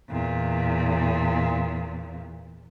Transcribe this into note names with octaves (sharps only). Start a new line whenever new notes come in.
E2 A#2